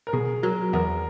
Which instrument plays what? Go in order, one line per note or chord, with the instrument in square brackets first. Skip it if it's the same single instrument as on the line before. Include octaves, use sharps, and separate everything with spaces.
[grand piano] A#4
[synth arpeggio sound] B2 [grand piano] G#4
[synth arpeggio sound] F#3 [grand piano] A#4
[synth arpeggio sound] E2 [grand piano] A#4